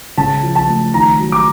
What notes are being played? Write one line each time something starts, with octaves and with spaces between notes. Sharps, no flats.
C#3 A5
F3
A5
A3
D#3 A#5
F#3
D6